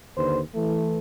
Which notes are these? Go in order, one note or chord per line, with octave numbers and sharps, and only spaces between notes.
D#2 D3 B4 C5
E3 A3